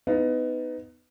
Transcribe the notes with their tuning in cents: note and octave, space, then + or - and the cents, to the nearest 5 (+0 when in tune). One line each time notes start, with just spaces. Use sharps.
B3 +20 D#4 +5 F5 +0